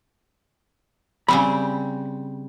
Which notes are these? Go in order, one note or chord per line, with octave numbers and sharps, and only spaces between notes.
C#3 G3 C4 B5